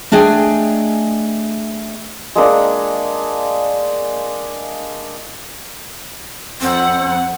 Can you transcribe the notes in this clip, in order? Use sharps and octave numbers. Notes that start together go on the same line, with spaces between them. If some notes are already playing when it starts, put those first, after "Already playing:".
A3 D4 G#4 D#5 G5 G#5
G#3 A#3 D4 F#5
F2 C4 F#5